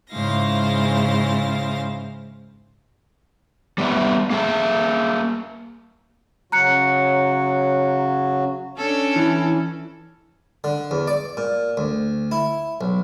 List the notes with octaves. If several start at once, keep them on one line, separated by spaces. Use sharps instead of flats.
G#2 C#3 E4 C5 F5 A#6
G3 B3 E5
A#3 G#4 E5
C#3 F#3 F#4 A#5 F#6 C#7
C#4 D4 A4
E3 E4
D3
E2
D5
A#2
D2
E4
B1